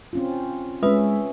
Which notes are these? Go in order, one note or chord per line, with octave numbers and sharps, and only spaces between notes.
C4 C#4 F4
G#3 C#4 F4 B4 E5 D#6